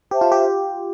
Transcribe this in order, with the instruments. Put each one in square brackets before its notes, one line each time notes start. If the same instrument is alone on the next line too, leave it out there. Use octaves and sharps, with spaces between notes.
[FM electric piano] G4 [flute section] C5 E5 A5
[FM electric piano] F4
G4